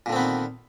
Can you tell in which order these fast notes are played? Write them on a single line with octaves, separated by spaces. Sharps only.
A#2 D3 C4 B3 D#3